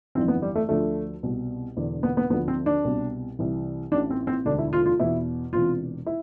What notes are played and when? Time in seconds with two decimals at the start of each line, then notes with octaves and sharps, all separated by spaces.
0.15 G1 F2 E3 C4
0.28 B3
0.42 G3
0.55 A3
0.69 D2 D3 F3 A3
1.23 C2 B2
1.77 E1 E2 D3
2.03 B3
2.17 B3
2.30 D2 D3 F3 B3
2.48 C4
2.66 D4
2.84 C2 B2
3.39 C2 C3 E3
3.92 A1 A2 E3 D4
4.10 C4
4.27 C4
4.45 E1 D2 D3 D4
4.59 E4
4.73 F4
4.86 F4
5.00 E2 B2 E4
5.53 E1 E2 C3 F4
6.06 E4